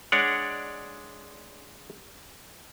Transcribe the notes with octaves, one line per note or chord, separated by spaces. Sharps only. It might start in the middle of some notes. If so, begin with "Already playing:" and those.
G#3 D4 C#5 D5 F#5